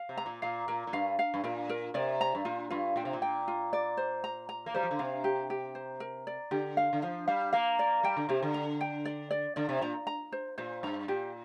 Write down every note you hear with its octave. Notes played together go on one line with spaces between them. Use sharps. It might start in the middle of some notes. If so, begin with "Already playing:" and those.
Already playing: F5
C3
A#5
A#2
A#2 F5
A#2 A#4
A#2
G2 F5
F5
G2
A#2 A#4
A#4
C3 D5
A#5
G2
A#2 F4
G2 F4
A#2 G5
C3
A#2
G5
F4
D5
C5
A#5
A#5
A#3
G3 C5
F3
D3
C3 F5
G4
G4
C5
A#4
D5
D3 G4
F5
D3
F3 F5
G3 F5
A#3 F5
D5
G3 G5
D3
C3 G4
D3
A#5
G5
D5
D5
D3 D5
C3
A#2 A#5
A#5
C5
A#2 C5
G2 A#5
A#2 G4